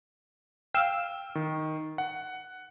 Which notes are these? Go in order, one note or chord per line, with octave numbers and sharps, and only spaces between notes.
F5 G5 E6 F6
D#3
F#5